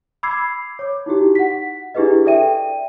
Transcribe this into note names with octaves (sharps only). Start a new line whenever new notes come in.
B5 D6 E6 G#6 C7
C#5 D6
D#4 E4 F#4 G4
F#5 B6
D4 E4 G4 G#4 B4 D#5
A4 D5 E5 G5 D#7